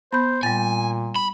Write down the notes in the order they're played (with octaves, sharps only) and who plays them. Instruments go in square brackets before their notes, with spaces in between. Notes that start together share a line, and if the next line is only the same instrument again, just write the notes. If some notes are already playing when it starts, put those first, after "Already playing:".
[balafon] B3 [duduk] C5 [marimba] B5 G6
[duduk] A#2 [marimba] G3 A6 [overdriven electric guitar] G#5
[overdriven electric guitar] B5